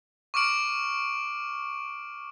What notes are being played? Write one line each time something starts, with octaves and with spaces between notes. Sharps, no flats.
C#6 D6 F6 D7 F#7